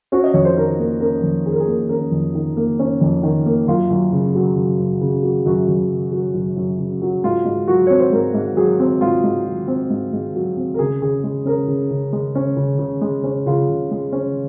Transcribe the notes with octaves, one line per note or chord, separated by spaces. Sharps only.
C#4 F#4
D#5
F2 C#5
C5
D#3 A#4
A#3
C#4 A#4
F2
D#3 G#4
A#4
G#4
A#3
C#4 A#4
F2
D#3
A#3
C#4
F2
D#3
A#3
F#2 F4
F#2
C#3
F#3
F#2
F#2
C#3
F#3
F#2 F#4
F#2
C#3
F#3
F#2
F#2
C#3
F#3
G#2 F4
G#2
F#3 F#4
C4 C#5
C5
G#2 A#4
G#2
F#3 G#4
C4
G#2 F4
G#2
F#3
C4
G#2
G#2
F#3
C4
A#4
C#3 G#4
C#3 G#4
G#3
C#4 A#4
C#3
C#3
G#3
C#4
C#3
C#3
G#3
C#4
C#3 F4
C#3
G#3
C#4